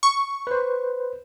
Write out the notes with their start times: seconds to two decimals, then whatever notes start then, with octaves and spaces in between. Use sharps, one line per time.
0.03 C#6
0.47 B4 C5